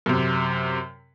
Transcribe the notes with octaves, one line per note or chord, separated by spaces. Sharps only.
F#2 C3